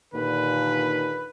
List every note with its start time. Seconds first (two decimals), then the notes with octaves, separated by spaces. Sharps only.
0.14 D#2 A#2 D3 B4